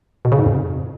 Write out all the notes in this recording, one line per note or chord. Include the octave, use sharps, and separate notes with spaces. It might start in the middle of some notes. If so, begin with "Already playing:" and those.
B2
C#3
G#2
F2